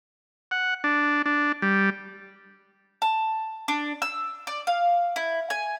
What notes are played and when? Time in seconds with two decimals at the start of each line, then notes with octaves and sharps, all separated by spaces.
0.51 F#5
0.84 D4
1.26 D4
1.62 G3
3.02 A5
3.68 D4
4.02 E6
4.47 D5
4.67 F5
5.16 E4
5.50 G#5